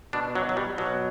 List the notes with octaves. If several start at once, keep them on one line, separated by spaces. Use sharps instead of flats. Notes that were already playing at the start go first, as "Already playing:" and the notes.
B2 D4
F#3
F#3
G3
B2 F#3